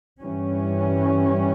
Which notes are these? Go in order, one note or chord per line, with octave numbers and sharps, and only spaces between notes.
G2 E3 G3 C#4